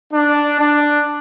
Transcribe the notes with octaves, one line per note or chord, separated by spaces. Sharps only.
D4
D4